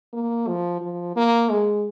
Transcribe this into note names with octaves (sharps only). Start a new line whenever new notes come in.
A#3
F3
F3
A#3
G#3